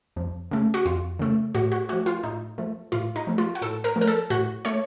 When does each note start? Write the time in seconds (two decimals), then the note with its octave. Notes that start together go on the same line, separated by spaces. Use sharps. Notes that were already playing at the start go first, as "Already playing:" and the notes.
0.16 F2
0.51 C#3 A3
0.74 F#4
0.85 F2 F4
1.19 C#3 A3
1.55 A2 F#4
1.72 F#4
1.89 F3 A3 F#4
2.06 F4
2.23 A2 D#4
2.58 F3 A3
2.92 A2 F4
3.16 D#4
3.27 F3 A3
3.38 F4
3.55 F#4
3.62 A2 A4
3.84 A#4
3.96 F3 A3
4.01 A#4
4.08 A4
4.30 A2 F#4
4.65 A3 C#5